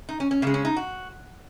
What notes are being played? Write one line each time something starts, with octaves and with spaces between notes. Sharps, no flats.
D#4
C#4
C#4
C#3 G#3 A#3
C#4
D#4
F#4